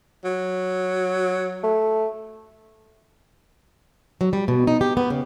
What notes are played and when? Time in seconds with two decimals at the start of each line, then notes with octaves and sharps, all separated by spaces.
0.24 F#3
1.63 A3
4.21 F#3
4.33 G3
4.48 B2
4.67 D#4
4.81 G4
4.97 B3
5.10 C#3